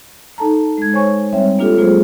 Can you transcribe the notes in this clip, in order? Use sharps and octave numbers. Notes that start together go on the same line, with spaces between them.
D#4 A4 A5 A#5
G#3 G#6
C5 C#5 G#5 C#6
G3 C4 C#5 E5
A#3 D4 F4 G4 A4
F#3 G#3 A#3 F4 G#4 C5